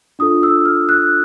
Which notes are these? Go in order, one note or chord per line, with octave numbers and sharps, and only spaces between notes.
D4 F4 A4 D#6
E6
F6
F#6